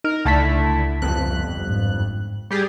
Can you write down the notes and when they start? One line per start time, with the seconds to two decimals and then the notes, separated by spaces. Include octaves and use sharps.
0.04 D#4 A#4 F6
0.25 C#2 D3 A3 E4 A5 B6
1.02 G1 F2 F#6
1.69 G#2
2.51 G3 G4 G#4